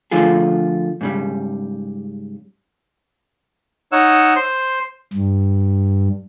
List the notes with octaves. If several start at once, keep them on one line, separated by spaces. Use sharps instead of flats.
D3 F3 A3 F4 G#4
G#2 C#3 G3
D#4 C#5 F#5 E6
C5 C6
G2